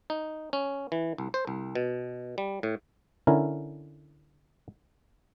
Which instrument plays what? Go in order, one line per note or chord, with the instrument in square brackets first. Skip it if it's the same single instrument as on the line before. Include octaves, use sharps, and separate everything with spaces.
[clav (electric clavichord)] D#4
C#4
E3
C2
C5
C2
B2
G3
A2
D3 C#4 E4 A#4